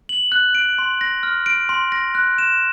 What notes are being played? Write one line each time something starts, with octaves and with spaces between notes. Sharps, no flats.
F#7
F#6
D7
C6
A#6
F6
D7
C6
A#6
F#6
E7